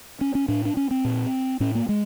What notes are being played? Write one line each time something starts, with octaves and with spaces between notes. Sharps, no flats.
C#4
C#4
A2 D4
D4
C#4
C4
A#2
A2 C#4
A#3
G#3